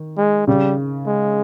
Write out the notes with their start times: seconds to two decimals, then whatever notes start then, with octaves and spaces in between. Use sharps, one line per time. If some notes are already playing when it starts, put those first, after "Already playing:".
Already playing: D#3
0.17 G#3
0.47 C#3 G3
1.07 G#3